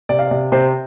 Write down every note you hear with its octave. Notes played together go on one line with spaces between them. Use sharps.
C3 D5
F5
D5
C3
C3 C5